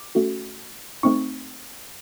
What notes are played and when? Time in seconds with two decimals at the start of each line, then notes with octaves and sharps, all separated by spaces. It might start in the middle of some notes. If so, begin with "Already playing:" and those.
Already playing: D6
0.15 A3 C#4 F#4 A4
1.03 A3 C4 D#4 C#6